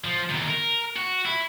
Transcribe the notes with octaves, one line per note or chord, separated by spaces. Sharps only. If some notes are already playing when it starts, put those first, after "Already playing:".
F3
E2 D#3
A#4
F#4
E4